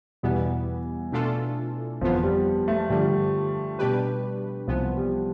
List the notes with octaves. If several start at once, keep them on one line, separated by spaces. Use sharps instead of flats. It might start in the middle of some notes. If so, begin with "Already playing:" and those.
E2 B2 E3 G3 B3
B2 A3 D4 F4 A4
G1 F2 E3 F3 B3 F4
G3
A3
G2 D3 F3 G3
B2 G3 D4 G4 B4
C2 C3 E3 F3 B3
G3